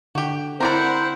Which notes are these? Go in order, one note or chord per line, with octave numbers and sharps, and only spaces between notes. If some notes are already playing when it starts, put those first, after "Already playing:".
D3 F#4 G4
C4 E4 A#4 C5 D5 F#5 A#5